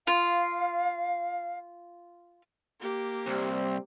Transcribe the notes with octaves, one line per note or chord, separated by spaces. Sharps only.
F4 F5
A#3 G4
C2 G3 C4